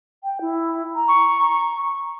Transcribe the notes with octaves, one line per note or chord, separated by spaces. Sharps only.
G5
E4
A#5
C#6